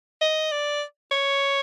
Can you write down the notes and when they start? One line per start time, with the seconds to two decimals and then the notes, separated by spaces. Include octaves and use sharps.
0.21 D#5
0.52 D5
1.11 C#5